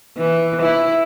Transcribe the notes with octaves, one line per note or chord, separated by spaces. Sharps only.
E3
E4